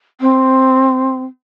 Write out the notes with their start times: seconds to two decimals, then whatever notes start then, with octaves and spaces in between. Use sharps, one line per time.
0.21 C4